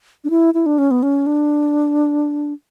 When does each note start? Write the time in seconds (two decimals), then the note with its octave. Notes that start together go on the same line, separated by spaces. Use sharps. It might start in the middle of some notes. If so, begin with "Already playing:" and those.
0.24 D4
0.30 E4
0.54 E4
0.66 D4
0.78 C#4
0.91 B3
1.03 C#4
1.26 D4